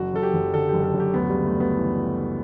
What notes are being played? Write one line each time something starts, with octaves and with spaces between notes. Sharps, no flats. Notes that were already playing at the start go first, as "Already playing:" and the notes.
Already playing: F#1 F#4
F#2 A4
G4
F#1
D3 A4
F#1 G4
A4
F#2
G4
D2 B3
G3
C#3
A3
D2
B3
E3